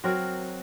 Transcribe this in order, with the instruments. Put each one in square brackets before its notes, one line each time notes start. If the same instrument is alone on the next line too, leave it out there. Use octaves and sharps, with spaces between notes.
[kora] F#3 C4 F#4 A#4